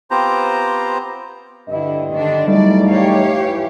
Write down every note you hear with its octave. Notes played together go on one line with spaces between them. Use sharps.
B3 C4 F4 G4 C5 A#5
G2 D3 E4 D#5
D3 D#3 D4
E2 F#3 G3 A3 D#4 D5
G4 C#5 F5
E3